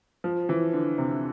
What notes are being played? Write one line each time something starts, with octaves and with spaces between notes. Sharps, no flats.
F3
E3
D3
C3